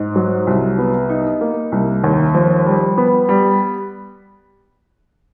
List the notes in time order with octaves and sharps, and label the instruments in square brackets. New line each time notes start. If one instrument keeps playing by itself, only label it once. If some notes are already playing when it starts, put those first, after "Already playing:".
Already playing: [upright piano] G#2
F#3
C2
B3
D#4
A#3
C2
D#2
F3
G3
B3
G3